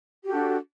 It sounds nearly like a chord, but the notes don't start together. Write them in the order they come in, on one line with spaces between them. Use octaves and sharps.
G4 F#4 A4 D4